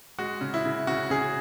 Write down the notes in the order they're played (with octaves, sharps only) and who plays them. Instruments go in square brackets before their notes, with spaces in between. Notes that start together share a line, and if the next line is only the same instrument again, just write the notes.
[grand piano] G#3 F#4
C#3
E4
C#3
C#3 F#4
C#3 G#4